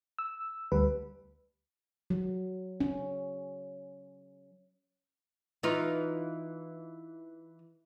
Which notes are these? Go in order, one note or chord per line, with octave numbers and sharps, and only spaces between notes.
E6
D2 G3 B4
F#3
C#4
E3 D#4 F4